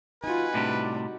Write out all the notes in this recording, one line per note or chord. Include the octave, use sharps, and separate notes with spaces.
D#4 F4 F#4 B4 G#5
A2 C3 G3 D4